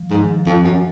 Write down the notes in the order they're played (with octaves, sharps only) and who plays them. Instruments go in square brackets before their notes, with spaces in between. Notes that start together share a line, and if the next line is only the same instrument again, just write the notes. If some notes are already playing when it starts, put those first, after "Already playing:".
Already playing: [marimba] F3
[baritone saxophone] G#2
[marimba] D#3
F3
[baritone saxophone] F2 [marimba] F#3
[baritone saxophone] F#2